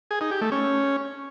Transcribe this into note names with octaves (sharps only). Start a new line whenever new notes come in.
G#4
D#4
G4
A3
C#4